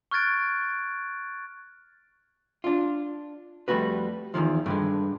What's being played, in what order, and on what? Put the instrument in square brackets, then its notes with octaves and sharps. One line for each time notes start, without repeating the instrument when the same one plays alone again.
[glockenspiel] C#6 F6 F#6 G#6 A6 D7
[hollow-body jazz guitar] D4 F4
F2 G3 A3 F#4 B4
E2 A2 D#3 F3
G2 D3 G#3